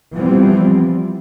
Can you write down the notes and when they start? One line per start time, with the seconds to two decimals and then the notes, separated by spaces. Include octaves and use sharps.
0.14 E3 F3 G3 B3 C4